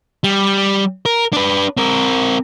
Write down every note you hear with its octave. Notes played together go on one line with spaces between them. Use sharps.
G3
A#4
D4 B4
C4 A#4